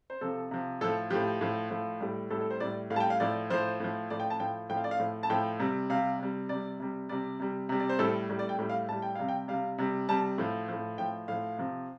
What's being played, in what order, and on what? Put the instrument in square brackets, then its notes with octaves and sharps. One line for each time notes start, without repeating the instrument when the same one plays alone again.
[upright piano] C5
C3 F3 A4
C3 F3
A2 F3 A4
A2 F3 G4
A2 F3
A2 F3
A2 G3
A2 G3 A4
A4
C5
A2 G3 D5
A2 F5
G3 A5
G5
F5
A2 F3 D5
A2 F3 C5
A2 F3
A2 F3 D5
G5
A5
A2 F3 G5
A2 F3 G5
F5
D5
F5
A2 F3
A5
A2 F3 G5
C3 G3
C3 G3 F5
C3 G3
C3 G3 D5
C3 G3
C3 G3 D5
C3 G3
C3 G3
D5
C5
A2 G3 A4
A2 G3
D5
G5
A2 G3
F5
A2 G3 A5
G5
C3 G3 F5
G5
C3 G3 F5
C3 G3
C3 G3 A5
A2 F3
A2 F3
A2 F3 G5
A2 F3 F5
C3 F3